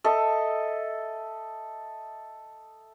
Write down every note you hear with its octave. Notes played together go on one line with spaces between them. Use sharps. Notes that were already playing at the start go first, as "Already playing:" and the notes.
A4 D#5 E5